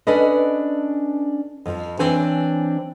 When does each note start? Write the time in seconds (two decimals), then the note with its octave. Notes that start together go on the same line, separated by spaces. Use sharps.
0.07 C#4 D4 A4 B4 D5 D#5
1.66 F2 F3
1.99 E3 C4 D4 C5 C#5 G#5